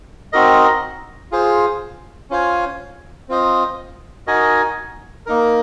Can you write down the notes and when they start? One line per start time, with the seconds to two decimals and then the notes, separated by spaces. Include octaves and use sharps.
0.33 C4 D#4 F#4 A#4 D#5
1.32 F4 G#4 C5
2.30 C#4 F4 C5 F5 G#5
3.29 C4 F4 C5 D#5
4.27 D#4 F#4 A#4 D#5 G#5
5.26 A#3 D#4 A#4